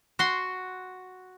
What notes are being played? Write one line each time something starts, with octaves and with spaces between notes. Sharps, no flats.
F#4 C6